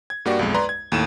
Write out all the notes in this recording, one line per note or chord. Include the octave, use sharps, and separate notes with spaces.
G#6
G2 A#3 F#4 G4 D5
B1 F2 G#3
B4 D5 A#5 C6
G#6
D#2 A2 E7